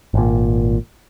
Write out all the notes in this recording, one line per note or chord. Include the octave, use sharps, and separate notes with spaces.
G#1 A#2